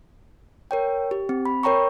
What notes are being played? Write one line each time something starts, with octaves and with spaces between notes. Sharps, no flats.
A#4 C#5 G5
G4
C4
B5
A#4 C#5 G5 A#5 C#6